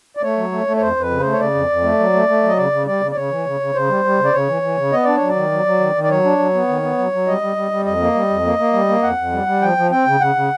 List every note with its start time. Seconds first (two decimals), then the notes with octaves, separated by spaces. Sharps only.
0.17 D5
0.23 A3 C#5
0.37 F#3
0.52 A3
0.67 A3
0.77 C#5
0.81 F2 C5
0.96 F2 B4
1.11 C#3
1.20 A3 C5
1.32 C#5
1.40 C#3 D5
1.55 F2
1.69 F2
1.83 A3
1.99 F#3
2.14 A3
2.28 A3
2.43 F#3 D#5
2.57 C#3 D5
2.72 C#3
2.87 G3 D5
3.01 C#3
3.11 D5
3.16 C#3 C#5
3.31 E3
3.46 C#3
3.60 C#3
3.75 C#3 C5
3.89 G3
4.05 G3
4.19 C#3
4.25 D5
4.33 C#3 C#5
4.48 E3
4.62 E3
4.77 C#3
4.92 B3 D#5
5.04 D4 D5
5.16 C#5
5.22 F#3
5.28 D5
5.36 D#3
5.51 F#3
5.66 F#3
5.80 D#3
5.95 D#3
6.04 D5
6.10 F#3 C#5
6.24 D4
6.39 F#3
6.54 B3
6.68 D#3
6.83 B3
6.98 F#3
7.12 F#3
7.27 G3 D#5
7.41 G3
7.56 G3
7.71 G3
7.85 F2 D#5
8.00 A#3
8.15 G3
8.30 F2
8.45 A#3
8.59 A#3
8.73 G3
8.89 A#3
9.03 F2 F#5
9.17 F2
9.32 G3
9.47 G3
9.62 F3 G5
9.77 F3
9.91 C4 G5
10.06 C#3
10.20 C#3 F#5
10.35 C#3